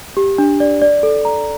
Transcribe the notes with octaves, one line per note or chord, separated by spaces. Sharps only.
G4
D4
D5
D5
A4
A#5